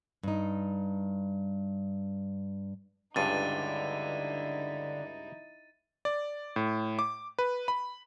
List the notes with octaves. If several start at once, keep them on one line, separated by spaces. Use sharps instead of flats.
G2 D#4
C#2 G2 D3 D#4 E4 A6 D#7
D5
A2
D6
B4
B5